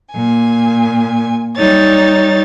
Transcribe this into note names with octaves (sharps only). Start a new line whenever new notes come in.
A#2 G#5
G3 D#4 C#5 A6